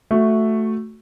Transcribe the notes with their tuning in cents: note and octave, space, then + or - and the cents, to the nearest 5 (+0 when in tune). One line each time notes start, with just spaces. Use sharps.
A3 +0 F#4 +0